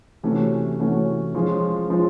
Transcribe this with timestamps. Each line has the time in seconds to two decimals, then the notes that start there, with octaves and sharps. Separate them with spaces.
0.23 C3 E3 A3 C#4 F#4
0.79 C3 E3 A3 C#4 F#4
1.35 F3 G#3 C#4 F4
1.90 F3 G#3 C#4 F4